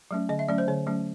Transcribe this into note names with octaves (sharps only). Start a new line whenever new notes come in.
F#3 A3 C#4
D3 D#5
E5
F#3 A3 C#4 D5
C5
D3 C#5
F#3 A3 C#4